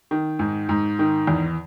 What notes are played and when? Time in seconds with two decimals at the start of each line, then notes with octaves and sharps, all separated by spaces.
0.11 D#3
0.39 G#2
0.69 G#2
0.99 D#3
1.27 E2